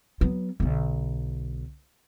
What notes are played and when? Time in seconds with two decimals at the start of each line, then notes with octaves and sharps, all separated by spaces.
0.21 F#3 B3
0.60 B1 D3